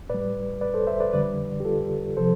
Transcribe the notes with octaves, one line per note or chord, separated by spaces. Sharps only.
A2 G3 B4 D5
B4 D5
A4 C5
C5 E5
B4 D5
F2 D3 G3 B4 D5
G4
F4 A4
C3 F3 A4 C5